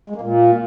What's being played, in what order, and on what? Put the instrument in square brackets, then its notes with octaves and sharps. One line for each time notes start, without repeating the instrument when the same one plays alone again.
[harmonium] G#3
A#3
A#2